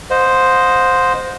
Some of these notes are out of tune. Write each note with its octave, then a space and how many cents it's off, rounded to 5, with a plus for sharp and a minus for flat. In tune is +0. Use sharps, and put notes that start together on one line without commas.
C5 +0 D#5 -5 F#5 -45